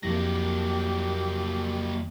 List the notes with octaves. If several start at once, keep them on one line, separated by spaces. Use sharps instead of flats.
F2 F#3 A#3 E4 G4 A#6